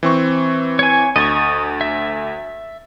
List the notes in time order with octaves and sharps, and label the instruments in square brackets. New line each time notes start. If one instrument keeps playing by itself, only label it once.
[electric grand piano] E3 C4 C#6
[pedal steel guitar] C#5 G#5
[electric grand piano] D2 A6 [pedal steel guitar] D#5 C#6
[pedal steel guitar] E5